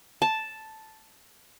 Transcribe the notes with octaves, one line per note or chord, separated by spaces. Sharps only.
A5